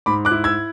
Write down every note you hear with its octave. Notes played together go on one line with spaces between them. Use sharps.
G#2 B5 D6
D6 F#6
E4
E6 G#6